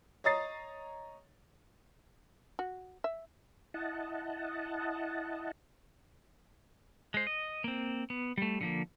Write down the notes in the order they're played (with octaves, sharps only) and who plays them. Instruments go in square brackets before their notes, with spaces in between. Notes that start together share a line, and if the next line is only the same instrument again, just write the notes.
[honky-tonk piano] C#5 D#5 A#5 D#6 A6 C7
[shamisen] F#4
E5
[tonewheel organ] E4 D#5 F#5 A5
[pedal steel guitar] G#3 C5
D#5
A#3 C4
B3
G3 A3
D3 F3 A#3